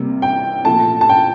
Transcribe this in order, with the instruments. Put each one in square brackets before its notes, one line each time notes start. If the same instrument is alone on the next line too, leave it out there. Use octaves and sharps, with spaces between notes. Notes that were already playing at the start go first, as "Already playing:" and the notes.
Already playing: [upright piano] C3 G3 A#3
G5
A#2 F3 A3 A5
A5
G5